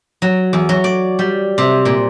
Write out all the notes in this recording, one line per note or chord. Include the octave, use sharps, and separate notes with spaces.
F#3
E2
F#3
D5
G3
C3
A#2